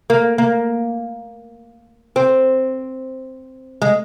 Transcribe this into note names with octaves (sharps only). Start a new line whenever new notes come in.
A#3
A#3
C4
G#3